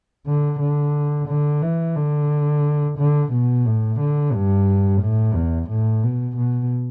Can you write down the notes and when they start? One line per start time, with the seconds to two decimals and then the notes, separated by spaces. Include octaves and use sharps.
0.27 D3
0.60 D3
1.28 D3
1.62 E3
1.96 D3
2.98 D3
3.32 B2
3.66 A2
4.00 D3
4.33 G2
5.01 A2
5.35 E2
5.70 A2
6.03 B2
6.37 B2